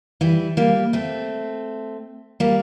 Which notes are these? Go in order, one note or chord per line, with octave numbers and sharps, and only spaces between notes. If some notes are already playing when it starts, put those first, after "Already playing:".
E3 G3
G3 A#3
A3 C4
G3 A#3